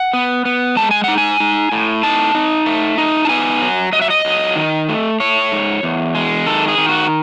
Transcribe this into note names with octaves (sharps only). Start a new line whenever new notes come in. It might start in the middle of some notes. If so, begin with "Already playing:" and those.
Already playing: F#5
B3
B3
G#3 A5
G#5
D#4 F#5
G#5
D#4
A2
D#4 A5
D#4
A3
D#4
A5
B3 G#5
F#3
F#3 D#5
E5
D#5
F#3
D#3
A3
A3 C#5
G#2
E2
G#3
D#3 A4
G#4
D#3
F#4